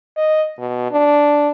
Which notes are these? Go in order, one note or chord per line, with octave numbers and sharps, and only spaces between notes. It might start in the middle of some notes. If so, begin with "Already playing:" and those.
D#5
B2
D4